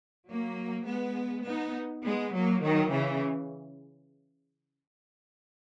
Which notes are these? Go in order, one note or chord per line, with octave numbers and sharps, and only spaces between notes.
F#3 A#3
G#3 B3
B3 D#4
G#3 B3
F#3 A#3
D#3 F#3
C#3 E3